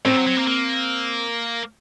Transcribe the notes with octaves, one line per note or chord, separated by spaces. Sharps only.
A2 C4
F#3
F#3
A#3
A#3